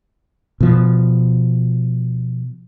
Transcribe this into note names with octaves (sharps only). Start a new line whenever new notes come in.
B2 F3